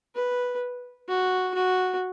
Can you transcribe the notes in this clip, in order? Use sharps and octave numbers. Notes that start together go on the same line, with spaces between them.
B4
F#4
F#4